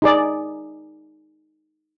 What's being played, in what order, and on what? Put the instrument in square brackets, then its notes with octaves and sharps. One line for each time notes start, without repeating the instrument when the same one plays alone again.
[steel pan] D#4 G#4 D5